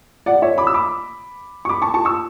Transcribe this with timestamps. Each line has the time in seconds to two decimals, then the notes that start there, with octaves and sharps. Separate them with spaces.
0.26 D5 F#5
0.42 C#5 E5
0.58 B5 D6
0.67 E6
0.74 B5 D6
1.65 C#6
1.69 B5 D6
1.82 A5 C#6
1.94 A5 C#6
2.05 C#6 E6